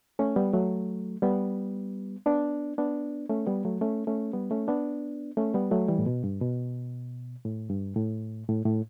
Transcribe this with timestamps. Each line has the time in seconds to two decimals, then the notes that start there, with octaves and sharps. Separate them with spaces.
0.19 A3 C#4
0.36 G3 B3
0.53 F#3 A3
1.22 G3 B3
2.26 B3 D4
2.78 B3 D4
3.29 A3 C#4
3.47 G3 B3
3.65 F#3 A3
3.81 A3 C#4
4.07 A3 C#4
4.33 G3 B3
4.51 A3 C#4
4.68 B3 D4
5.37 A3 C#4
5.54 G3 B3
5.71 F#3 A3
5.89 E3 G3
5.99 A2
6.06 B2
6.24 G2
6.41 B2
7.45 A2
7.70 G2
7.96 A2
8.48 A2
8.66 A2